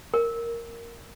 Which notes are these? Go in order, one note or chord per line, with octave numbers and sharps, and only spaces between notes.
A#4